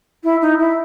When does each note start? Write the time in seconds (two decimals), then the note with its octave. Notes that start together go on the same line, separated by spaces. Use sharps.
0.24 E4
0.41 D#4
0.59 E4